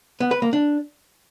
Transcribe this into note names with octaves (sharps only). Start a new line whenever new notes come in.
B3
B4
A#3
D4